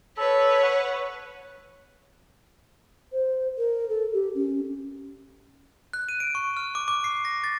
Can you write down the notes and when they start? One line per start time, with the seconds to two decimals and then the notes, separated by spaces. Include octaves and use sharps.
0.17 A4 B4 C#5
0.63 F#5 C#6
3.13 C5
3.58 A#4
3.89 A4
4.13 G4
4.35 C#4
5.93 F#6
6.09 D#7
6.20 D7
6.35 C#6
6.57 F6
6.75 D6
6.88 D6
7.04 C7
7.25 A#6
7.44 A6